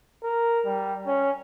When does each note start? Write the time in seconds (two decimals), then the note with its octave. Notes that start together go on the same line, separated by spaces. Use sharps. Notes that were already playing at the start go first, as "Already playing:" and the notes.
0.23 A#4
0.65 G3
1.06 C#4